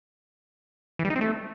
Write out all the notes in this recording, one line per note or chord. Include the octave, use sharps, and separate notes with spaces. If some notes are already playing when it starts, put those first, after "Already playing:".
E3
G3
D#4
C4
A3